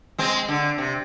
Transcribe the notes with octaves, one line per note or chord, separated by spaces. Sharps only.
G#3 C4
D3
C3